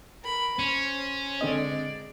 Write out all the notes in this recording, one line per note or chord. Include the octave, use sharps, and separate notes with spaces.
A#4 B5
C#4 C5
D3 G#3 C4 D5 D#5